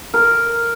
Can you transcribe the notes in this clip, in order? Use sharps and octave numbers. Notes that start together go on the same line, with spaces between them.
A#4